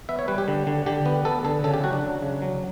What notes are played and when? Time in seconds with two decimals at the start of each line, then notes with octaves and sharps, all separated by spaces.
0.09 B3 E5
0.19 C#5
0.28 G3 B4
0.38 G4
0.48 D3
0.67 D3
0.86 D3 G4
1.06 B3
1.25 B3 A4
1.45 D3 A4
1.64 C#3 A4
1.74 G4
1.84 F#3 F#4
1.93 D4
2.03 F#3
2.22 C#3
2.42 F#3